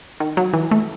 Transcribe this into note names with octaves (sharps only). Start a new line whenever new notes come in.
D#3
F#3
E3
A3